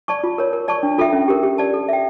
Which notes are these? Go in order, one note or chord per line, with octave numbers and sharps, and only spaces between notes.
D5 A5 C#6
F4
A#4 C#5
A#4
D5 A5 C#6
D4
F4 A4 E5 G5
C#4
G4 A#4
G4
D5 A5
A4
E5 G5